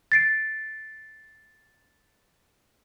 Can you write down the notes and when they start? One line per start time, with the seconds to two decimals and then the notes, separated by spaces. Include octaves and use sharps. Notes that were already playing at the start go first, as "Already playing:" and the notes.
0.12 A6 C7 D7